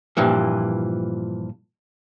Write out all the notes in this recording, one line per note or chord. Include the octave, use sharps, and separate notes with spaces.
G2 A#2 E3 F3